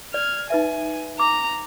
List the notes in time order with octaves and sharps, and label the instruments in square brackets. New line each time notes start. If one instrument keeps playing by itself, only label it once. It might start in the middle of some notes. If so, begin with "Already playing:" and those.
[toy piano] D5 [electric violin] F6 G#6
[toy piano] D#4 B4 E5 [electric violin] G#5
[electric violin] A#5 [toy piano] D6